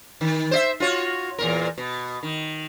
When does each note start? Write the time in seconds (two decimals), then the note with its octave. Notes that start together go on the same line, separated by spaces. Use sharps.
0.21 D#3
0.51 C5 D5 E5
0.80 F4 F#4 C#5
1.38 E2 A#2 A#4
1.78 B2
2.23 D#3